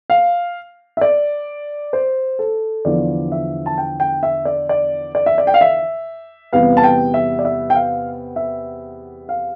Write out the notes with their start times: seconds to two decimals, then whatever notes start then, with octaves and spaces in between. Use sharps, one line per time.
0.10 F5
0.97 E5
1.01 D5
1.93 C5
2.39 A4
2.85 E2 D3 F3 D5
3.32 E5
3.66 A5
3.78 G5
4.00 G5
4.23 E5
4.45 D5
4.69 D5
5.15 D5
5.26 E5
5.38 D5
5.47 G5
5.54 F5
5.61 E5
6.52 E2 C3 G3 B3 F5
6.77 A5
6.84 G5
7.14 E5
7.39 D5
7.45 E5
7.70 G5
7.75 F5
8.36 E5
9.29 F5